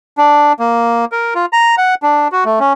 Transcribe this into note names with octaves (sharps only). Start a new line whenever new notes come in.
D4
A#3
A#4
F4
A#5
F#5
D4
F#4
A3
C#4